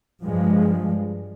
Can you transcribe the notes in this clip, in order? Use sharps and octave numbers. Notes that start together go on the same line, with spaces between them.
G2 F3 G#3